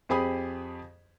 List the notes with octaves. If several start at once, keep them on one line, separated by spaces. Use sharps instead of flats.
F2 C4 G4 G#4 B5 D#6